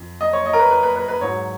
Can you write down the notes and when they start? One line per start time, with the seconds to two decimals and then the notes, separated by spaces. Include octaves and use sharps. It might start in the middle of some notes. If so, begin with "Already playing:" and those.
Already playing: F2
0.21 D#5
0.33 C#5
0.46 D#5
0.53 A#4
0.59 B4
0.71 B4
0.83 B4
0.96 B4
1.08 B4
1.21 G#2 F#3 C#5